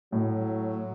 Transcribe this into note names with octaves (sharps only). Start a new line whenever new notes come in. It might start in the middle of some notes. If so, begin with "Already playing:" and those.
A2 F#3